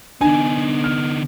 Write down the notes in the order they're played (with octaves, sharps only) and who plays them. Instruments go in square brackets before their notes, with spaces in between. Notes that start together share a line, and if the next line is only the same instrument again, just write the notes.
[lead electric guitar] D3 D#4 [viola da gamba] B3 [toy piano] D4 [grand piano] G#5
[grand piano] F6